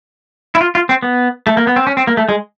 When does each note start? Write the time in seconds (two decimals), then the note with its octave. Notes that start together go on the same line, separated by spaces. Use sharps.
0.55 E4
0.61 F4
0.75 F4
0.89 C4
1.03 B3
1.47 A3
1.57 A#3
1.67 B3
1.76 C4
1.87 C#4
1.97 C4
2.07 A#3
2.17 A3
2.29 G#3